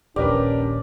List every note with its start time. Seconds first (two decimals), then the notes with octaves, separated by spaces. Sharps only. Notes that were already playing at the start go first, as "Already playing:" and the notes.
0.16 D#1 A#1 C#4 D4 G4 A#4 B4 D5